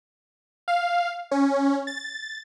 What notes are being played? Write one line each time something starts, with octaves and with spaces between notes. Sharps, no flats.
F5
C#4
A6